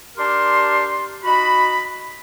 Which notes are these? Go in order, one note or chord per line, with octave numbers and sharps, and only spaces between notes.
D4 G4 A#4 A5 C6
D#4 F#4 B5